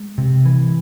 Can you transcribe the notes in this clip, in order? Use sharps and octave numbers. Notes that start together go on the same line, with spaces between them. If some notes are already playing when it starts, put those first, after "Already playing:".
Already playing: G#3
C3
E3